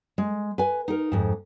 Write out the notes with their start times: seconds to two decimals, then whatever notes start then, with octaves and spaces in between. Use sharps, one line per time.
0.18 G#3
0.58 B4 G#5
0.88 D#4 A#4
1.12 F2 G#2